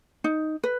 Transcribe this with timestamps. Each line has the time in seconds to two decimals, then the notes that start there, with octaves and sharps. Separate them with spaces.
0.24 D#4
0.64 B4